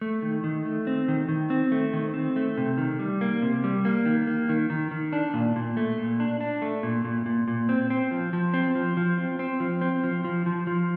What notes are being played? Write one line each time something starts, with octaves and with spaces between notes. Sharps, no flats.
A3
D#3
D#3
A3
C4
D#3
D#3
C4
A3
D#3
C4
A3
C3
D#3
G3
A#3
C3
G3
A#3
D#3
A#3
D#3
D#3
D#3
D4
A#2
A#2
A3
A#2
D4
D4
A3
A#2
A#2
A#2
A#2
C4
C4
F3
F3
C4
F3
F3
C4
C4
F3
C4
F3
F3
F3
F3